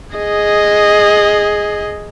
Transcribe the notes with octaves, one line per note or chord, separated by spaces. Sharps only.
G#4 D#5